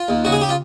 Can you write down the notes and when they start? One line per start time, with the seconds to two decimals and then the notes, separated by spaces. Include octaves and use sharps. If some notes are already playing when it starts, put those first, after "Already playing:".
Already playing: F4
0.08 D#2
0.25 C#3 F#4
0.32 G#4
0.41 G4
0.49 F4